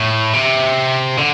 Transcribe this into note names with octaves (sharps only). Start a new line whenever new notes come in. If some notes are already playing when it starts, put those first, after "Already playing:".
Already playing: A2
C3
D3